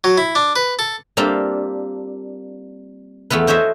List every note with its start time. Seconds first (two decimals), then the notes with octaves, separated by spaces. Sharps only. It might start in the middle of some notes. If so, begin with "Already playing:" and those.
0.04 F#3
0.18 E4
0.35 D4
0.56 B4
0.79 A4
1.17 G3 A#3 C4 D4 F4
3.30 E2 A3 B3 F4 B4
3.47 F#4 C5 C#5 D#5 E5